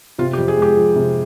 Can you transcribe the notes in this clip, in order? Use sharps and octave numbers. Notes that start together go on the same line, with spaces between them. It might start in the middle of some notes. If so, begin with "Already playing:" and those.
C3 F4
G4
F2
G#4
G#3 G4
F3
C3